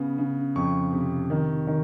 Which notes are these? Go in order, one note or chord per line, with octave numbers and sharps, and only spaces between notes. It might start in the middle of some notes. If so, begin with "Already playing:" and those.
Already playing: C#3 B3
C#3
F2 C#6
C3
D#3
D#3